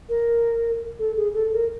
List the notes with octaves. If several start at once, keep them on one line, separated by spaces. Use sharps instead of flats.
A#4
A4
G#4
A4
A#4